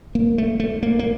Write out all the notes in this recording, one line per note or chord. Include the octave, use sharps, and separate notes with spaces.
A#3
A3
A3
A#3
A#3